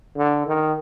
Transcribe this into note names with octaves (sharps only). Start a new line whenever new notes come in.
D3
D#3